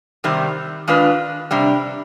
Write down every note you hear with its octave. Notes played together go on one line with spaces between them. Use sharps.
C3 D#3 G3 C4
D#3 G#3 D4 F4 B4
C3 G3 D4